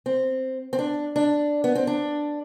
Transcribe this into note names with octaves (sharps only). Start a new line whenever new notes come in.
C4
C4
D4
D4
B3
C4
D4